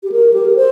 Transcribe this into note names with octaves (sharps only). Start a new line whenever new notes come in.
G4
A#4
G4
A#4
C5